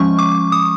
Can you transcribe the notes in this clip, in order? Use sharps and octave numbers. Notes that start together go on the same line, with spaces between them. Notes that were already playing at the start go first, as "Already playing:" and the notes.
Already playing: F3 G#3 C#4 C#6
D6
D#6